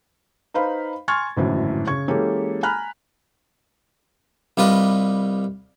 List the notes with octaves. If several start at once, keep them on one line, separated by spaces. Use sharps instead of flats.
D#4 B4 C5 F5 B5
G#5 C6 C#6 F6 G#6 A6
G#1 F#2 A2 D3 E3
C#3 C#6 G#6
E3 G#3 A#3 C#4 G4 A4
G#5 A#5 B5 F6 F#6
C2 G3 F4 B4 D#5